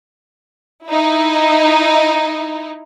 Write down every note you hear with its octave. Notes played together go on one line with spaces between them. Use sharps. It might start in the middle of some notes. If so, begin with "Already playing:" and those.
D#4 E4